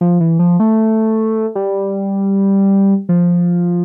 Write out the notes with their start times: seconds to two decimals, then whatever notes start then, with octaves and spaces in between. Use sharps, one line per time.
0.01 F3
0.20 E3
0.39 F3
0.60 A3
1.55 G3
3.09 F3